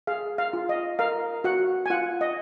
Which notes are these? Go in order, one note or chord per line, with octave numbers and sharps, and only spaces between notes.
G#4 F5
F5
F4
D#5
A#4 F5
F#4 F#5
G#5
F4 F#5
D#5